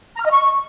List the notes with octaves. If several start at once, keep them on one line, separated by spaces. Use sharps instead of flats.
A#5
F6
D#5
C#6